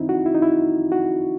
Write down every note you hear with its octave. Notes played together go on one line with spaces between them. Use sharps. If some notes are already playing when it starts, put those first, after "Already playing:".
Already playing: F#2 D#3 C4 D#4 E4
F#4
E4
D#4
E4
F#4